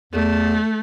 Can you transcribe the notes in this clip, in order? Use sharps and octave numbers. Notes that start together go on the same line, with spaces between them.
E2 A3